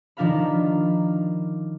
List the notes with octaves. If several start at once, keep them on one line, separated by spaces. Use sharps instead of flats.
D#3 F3 D4 A#4 F5 B5